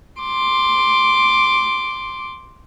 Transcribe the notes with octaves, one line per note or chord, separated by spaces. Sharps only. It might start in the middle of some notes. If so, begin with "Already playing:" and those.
C6 D6